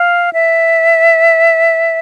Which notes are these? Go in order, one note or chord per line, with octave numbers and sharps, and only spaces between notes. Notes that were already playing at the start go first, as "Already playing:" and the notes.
Already playing: F5
E5